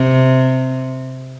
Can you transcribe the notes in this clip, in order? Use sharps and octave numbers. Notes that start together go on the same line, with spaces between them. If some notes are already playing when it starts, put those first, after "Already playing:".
Already playing: C3